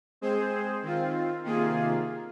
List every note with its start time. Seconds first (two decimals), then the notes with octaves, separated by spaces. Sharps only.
0.21 G#3 C4 G#4 C5
0.82 D#3 C4 F4
1.44 C3 D#3 A#3 F4 G#4